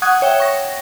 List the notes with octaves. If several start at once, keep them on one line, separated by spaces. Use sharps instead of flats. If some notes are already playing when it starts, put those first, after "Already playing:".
F#5 C#6 D#6 F#6 G#6
C#5 E5 G5
C#6 A#6